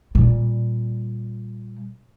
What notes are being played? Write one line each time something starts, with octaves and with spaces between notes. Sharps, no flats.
A#2 G3